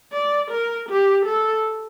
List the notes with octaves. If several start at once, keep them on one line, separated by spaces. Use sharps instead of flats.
D5
A#4
G4
A4